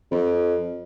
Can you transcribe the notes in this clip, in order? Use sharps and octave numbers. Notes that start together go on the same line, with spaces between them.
F2